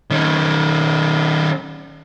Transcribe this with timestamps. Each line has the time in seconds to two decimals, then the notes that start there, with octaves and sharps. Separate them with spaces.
0.11 D#3 C#4